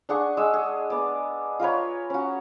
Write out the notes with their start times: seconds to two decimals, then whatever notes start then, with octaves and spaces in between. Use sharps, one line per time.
0.09 D4 G#4 F#5 C#6
0.37 G#3 E6
0.54 G#4
0.90 B3 D5
1.60 F4 A#4 B4 C#5
2.10 C#4 F#4